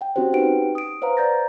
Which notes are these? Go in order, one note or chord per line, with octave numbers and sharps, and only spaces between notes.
F#5 G5
C4 C#4 F#4 G4 C5
D#4 G4 B4 F#5 G5 D7
D#6 D7
B4 C5 F5 F#5 A#5
C5 D5 A#5 G6 A6 A#6